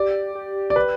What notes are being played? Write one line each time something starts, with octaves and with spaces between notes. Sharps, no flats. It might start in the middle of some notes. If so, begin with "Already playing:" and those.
Already playing: G4 D5
G4
D5
B4